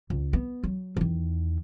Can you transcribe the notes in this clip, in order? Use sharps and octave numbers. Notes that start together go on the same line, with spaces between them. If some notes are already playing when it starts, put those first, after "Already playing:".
C#2
B3
F#3
E2 D#3